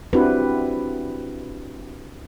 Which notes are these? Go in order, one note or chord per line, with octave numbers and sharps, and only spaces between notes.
C4 D4 E4 F#4 G4 B4